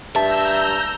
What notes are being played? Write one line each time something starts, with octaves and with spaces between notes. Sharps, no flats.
G2 E5 A5 A#5 E6 G6